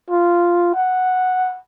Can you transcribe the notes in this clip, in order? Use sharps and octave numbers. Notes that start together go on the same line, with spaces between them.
F4
F#5